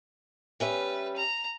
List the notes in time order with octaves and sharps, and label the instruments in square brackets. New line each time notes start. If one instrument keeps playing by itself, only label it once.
[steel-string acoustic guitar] G3 C#4 E5 [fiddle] B4
[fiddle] A#5